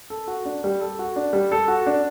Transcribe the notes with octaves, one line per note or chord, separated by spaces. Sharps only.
A4
F#4
D4
G3
A4
F#4
D4
G3
A4
F#4
D4